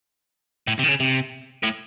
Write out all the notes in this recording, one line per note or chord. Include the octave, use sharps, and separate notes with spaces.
A2
C3
D#3
C#3
C3
A2